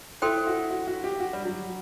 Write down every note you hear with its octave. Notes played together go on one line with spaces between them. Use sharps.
E4 A4 C5 G5 C6
F#4
F#4
F#4
G4
F#4
G3
F#3